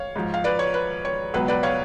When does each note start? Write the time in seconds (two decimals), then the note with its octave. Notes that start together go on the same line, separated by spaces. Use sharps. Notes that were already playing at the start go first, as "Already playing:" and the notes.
Already playing: C#5 F5
0.16 G#2 F3
0.34 F5
0.44 B4 D5
0.59 C#5
0.74 B4
1.05 C#5
1.34 C#2 B2 F#3 B4
1.48 B4 D5
1.63 C#5 F5